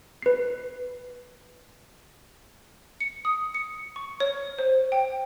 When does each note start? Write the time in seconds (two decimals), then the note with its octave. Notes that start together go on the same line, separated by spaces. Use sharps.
0.22 B4 C7
3.00 C#7
3.25 D#6
3.55 C#7
3.96 C#6
4.20 C#5
4.59 C5
4.92 G5